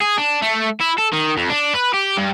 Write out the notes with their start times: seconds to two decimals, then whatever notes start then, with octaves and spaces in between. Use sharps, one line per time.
0.01 G#4
0.18 D4
0.42 A3
0.81 E4
0.99 A4
1.13 D#3
1.37 F2
1.50 D4
1.74 B4
1.94 G4
2.17 G2